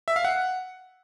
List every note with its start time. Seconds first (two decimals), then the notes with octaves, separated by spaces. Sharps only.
0.08 E5
0.16 F5
0.25 F#5